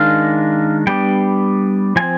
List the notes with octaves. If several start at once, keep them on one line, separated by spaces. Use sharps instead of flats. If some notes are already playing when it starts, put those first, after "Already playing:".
Already playing: D#3 G#3 D4 F5
G3 B3 D4 G5
F3 C4 G#5